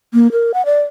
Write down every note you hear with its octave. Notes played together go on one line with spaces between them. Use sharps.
A#3
A#4
F#5
D5